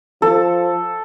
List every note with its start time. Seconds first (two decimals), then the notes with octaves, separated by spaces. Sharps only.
0.22 F3 A4